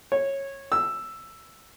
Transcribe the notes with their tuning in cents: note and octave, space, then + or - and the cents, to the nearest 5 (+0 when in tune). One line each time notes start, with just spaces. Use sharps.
C#5 -15
E6 +5